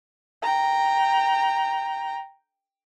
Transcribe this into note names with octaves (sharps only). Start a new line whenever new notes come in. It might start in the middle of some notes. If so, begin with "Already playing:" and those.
G5 A#5